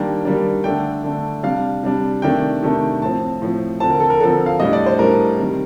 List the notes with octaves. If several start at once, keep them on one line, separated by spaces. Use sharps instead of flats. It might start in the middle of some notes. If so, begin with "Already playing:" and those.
Already playing: D#3 G3 A#3 D4 G5
D#3 G3 A#3 D4
D3 A3 D4 G5
D3 A3 D4
C3 G3 D4 F5
C3 G3 D4
C3 D#3 A3 D4 G5
C3 D#3 A3 D4
A2 F3 C4 A5
A2 F3 C4
D3 F3 C4 A5
A#4
A4
A#4
D3 F3 C4 A4
F5
A2 G3 D4 D#5
D5
C5
A2 G3 D4 A#4
C3 D#3 G3